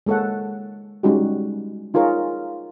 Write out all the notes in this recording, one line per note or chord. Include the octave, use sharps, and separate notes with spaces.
G#3 A#3 A4 C#5 F#5
G3 G#3 C#4 D#4 F#4 G4
D#4 F4 G#4 A#4 C#5